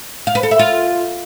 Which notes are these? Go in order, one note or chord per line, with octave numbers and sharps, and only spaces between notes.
F5
B4
A4
E5
F4